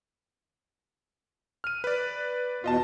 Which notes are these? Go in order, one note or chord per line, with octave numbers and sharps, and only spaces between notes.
F6 D#7
B4 D5
E2 B2 F4 D#5 A5